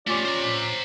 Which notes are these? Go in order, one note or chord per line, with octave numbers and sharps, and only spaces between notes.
A3 C#4 F4 G4 D5
C5 A#5